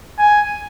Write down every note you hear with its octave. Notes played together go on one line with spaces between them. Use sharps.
G#5